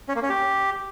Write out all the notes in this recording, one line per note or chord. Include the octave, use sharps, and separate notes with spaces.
C#4
A#3
C#4
G4